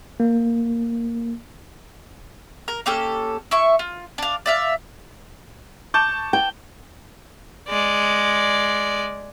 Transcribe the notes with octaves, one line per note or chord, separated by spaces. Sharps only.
A#3
A#4
A#3 C#4 G4 A4
E4 E5 C#6
F4
D4 F5
D5 E5 F5
A5 C#6 D6 G6
G5
G#3 D5